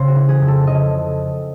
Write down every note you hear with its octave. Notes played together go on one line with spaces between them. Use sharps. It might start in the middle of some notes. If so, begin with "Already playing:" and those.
Already playing: C#3 C5
F#4
E3
G#4
F2
A4
C#3 D#5